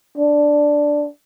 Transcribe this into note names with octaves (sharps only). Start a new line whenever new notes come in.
D4